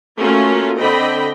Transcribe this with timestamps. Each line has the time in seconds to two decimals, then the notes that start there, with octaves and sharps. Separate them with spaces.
0.19 A3 A#3 C#4 F4 F#4 A#4
0.79 D3 C4 D#5 G5 B5